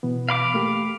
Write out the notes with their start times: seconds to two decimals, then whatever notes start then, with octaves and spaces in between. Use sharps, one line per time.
0.03 B2 E3 B3
0.29 F5 B5 D6
0.54 A3 A#3 G4